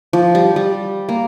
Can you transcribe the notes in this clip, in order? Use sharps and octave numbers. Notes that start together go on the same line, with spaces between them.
F3
G3
G3
A#3